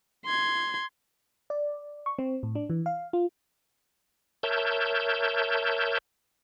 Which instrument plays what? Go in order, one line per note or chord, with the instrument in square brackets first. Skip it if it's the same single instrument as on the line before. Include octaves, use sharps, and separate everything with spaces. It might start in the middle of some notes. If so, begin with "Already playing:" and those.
[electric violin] C6 G#6
[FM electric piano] D5
C#6
C4
A2
D4
E3
F5
F4
[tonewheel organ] A#4 C#5 E5 A5 G6